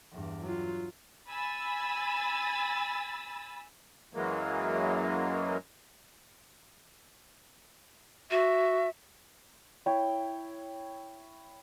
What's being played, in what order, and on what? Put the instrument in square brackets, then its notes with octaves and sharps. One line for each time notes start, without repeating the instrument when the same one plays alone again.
[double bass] E2 G2
[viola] F#3 F4
[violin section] G#5 B5 E6 A6
[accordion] F#2 E3 F#3 G#3 A#3
[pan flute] F#4 [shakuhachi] E5
[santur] E4 C#5 G5